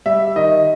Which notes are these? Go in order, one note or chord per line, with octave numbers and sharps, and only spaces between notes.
G3 E5
D#3 D#5